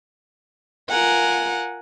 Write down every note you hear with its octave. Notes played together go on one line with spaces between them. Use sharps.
F4 A#4 F#5 G#5